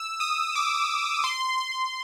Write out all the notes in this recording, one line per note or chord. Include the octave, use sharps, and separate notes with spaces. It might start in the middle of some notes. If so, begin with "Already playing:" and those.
Already playing: E6
D#6
D6
C6
C6